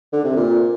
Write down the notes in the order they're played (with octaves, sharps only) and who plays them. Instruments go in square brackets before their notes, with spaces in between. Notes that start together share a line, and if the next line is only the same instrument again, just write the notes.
[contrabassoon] D3
C3
A#2